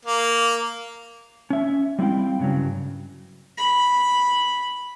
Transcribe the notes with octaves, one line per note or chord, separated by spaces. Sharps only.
A#3
C#4 E5
G3 C4 E4 F5 G5
G2 C#3 F#3
B5